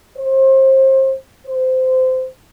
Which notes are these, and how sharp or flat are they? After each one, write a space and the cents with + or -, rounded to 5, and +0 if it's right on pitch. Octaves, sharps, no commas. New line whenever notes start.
C5 +30
C5 -20